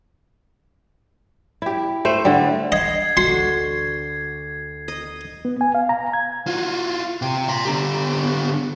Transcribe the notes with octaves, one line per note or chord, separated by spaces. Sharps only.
E4 G4
A3 C5
D3 G3
D#5 G#6 C7
D2 F#4 C6
D#5
B3
G#5
F5
A#5
G#6
F4 F#4
C3 G5
A#5 C6
D3 G4